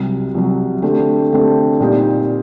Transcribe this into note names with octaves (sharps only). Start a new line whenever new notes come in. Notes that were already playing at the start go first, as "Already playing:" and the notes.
Already playing: C2 C3 F#3
C2 C3 F#3
D3 A3 C4 G4
D3 A3 C4 G4
A#2 G3 C4 D#4 G4